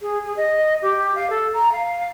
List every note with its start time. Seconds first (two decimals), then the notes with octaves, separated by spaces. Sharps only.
0.01 G#4
0.25 G#4
0.37 D#5
0.82 G4
1.15 F5
1.30 A4
1.54 A#5
1.72 F5